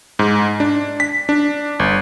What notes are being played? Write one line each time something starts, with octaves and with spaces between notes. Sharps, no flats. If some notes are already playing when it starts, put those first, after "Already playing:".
G#2
D4
B6
D4
G1